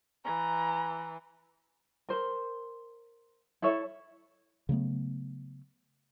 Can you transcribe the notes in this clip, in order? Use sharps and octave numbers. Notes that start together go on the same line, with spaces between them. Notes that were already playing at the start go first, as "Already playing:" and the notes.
E3 A#5
A#4 C5
E4 A4 C#5 E5
C#3 F#3 A3 B3